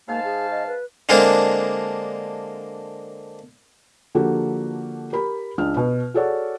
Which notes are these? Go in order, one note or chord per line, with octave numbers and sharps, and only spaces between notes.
G#2 A#3 F5 A5
G#4
D#5
B4
D3 G#3 A#3 C4 D4
D3 F3 A#3 F#4 G4 A4
G4 A#4 B5
C#2 D4 F6
B2 B4
F#4 G#4 A4 C#5 D5 F#5